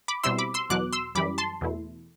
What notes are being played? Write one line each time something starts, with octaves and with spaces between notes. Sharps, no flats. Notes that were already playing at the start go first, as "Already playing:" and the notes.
B5 D6
B2 G3 C4 E4 C6 E6
B5 D6
C6 E6
E2 B2 F#3 D6 F#6
C6 E6
F#2 E3 G3 B5 D6
A5 C6
E2 B2 A3 E4